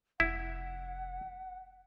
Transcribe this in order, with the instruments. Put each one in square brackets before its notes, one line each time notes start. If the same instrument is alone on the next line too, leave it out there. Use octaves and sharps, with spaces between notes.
[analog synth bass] F1 [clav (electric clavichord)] E4 [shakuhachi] F#5